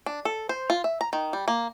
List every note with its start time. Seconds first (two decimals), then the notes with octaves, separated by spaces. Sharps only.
0.06 D4
0.25 A4
0.49 C5
0.70 F4
0.84 E5
1.01 A#5
1.13 D#3
1.33 G3
1.48 A#3